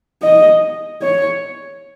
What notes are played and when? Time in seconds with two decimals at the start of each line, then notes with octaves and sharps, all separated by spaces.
0.22 D#5
1.02 C#5